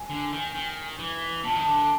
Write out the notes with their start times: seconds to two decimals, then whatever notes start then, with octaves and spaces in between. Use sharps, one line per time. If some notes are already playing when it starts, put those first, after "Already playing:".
Already playing: G#5
0.10 D3
0.33 D#3
0.55 D#3
0.99 E3
1.44 A#2 A5
1.56 D#3
1.67 D3